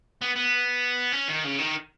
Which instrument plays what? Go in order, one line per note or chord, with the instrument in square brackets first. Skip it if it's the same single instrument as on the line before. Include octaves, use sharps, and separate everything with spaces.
[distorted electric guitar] B3
B3
C#4
D#3
C#3
D#3